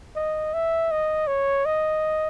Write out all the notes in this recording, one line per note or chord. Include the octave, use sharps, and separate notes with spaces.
D#5
E5
D#5
C#5
D#5